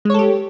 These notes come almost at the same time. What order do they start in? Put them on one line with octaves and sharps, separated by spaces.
G#3 C#5 A4 G4